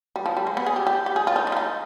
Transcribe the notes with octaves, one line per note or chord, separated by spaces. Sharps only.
G3
F3
G3
G#3
B3
G#4
G4
G4
G4
G#4
F4
D#4
D4
F4
D#4